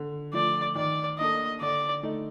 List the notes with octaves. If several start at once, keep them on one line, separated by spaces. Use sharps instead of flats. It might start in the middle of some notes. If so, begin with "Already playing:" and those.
Already playing: D3
F3 A3 D5
D#3 D5
A#3 D4 A4 D#5
D3 D5
A3 D#4